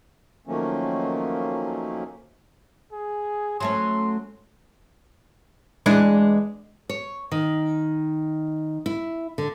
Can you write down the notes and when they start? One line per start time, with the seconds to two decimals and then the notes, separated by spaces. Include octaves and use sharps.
0.47 D#3 F3 F#3 A3 A#3 C#4
2.92 G#4
3.60 F#3 A3 C#4 C6
5.86 E2 G#3 D4
6.89 C#5
7.32 D#3
8.86 E4
9.38 D3